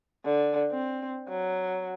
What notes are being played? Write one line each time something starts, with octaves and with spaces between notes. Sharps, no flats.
D3
C4
F#3